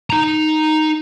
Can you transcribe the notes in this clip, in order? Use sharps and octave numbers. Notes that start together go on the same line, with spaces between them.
D#4 A#5